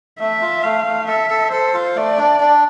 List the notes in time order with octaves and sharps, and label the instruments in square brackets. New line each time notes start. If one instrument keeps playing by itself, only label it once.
[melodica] A3 [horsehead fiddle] E5
[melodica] F4
[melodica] A3 [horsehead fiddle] F5
[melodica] A3
[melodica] A4 [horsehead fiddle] E5
[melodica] A4
[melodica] A4 [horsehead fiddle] C5
[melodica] F4
[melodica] A3 [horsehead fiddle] D5
[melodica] D4
D4